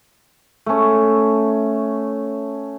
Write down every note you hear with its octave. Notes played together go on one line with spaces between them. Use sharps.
A3 C#4